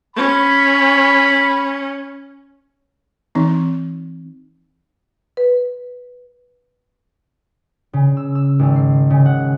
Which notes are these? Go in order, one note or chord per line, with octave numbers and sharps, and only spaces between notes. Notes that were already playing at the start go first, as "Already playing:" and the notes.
C#4 B5
E3 C4 D#4
B4
C#3
E6
E6
G#1
C7
C#3
F#5